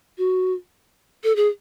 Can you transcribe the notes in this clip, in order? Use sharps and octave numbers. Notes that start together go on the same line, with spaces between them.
F#4
A4
G#4